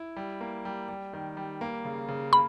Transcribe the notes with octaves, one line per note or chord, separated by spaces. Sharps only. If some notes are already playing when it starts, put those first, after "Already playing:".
Already playing: E4
G3
A#3
G3
G3
D#3
G3
A#3
C#3
C#3
A#3 B5